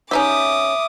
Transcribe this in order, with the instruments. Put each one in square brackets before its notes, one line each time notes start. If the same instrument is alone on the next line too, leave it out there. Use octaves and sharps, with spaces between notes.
[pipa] C#4 D#4 G4 [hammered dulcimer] E5 [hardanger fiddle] D6 D#6